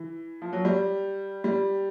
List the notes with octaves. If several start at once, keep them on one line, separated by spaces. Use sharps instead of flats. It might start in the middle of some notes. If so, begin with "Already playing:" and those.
Already playing: E3
F3
F#3
G3
G3